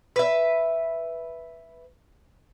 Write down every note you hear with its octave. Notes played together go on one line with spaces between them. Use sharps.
B4 E5